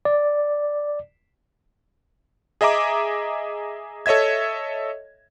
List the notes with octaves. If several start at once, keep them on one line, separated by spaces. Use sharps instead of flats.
D5
G#4 D#5 E5 A#5 D6
A4 C#5 D#5 E5 G#6